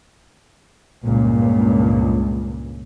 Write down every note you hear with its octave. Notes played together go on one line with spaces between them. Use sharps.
C#2 G2 A#2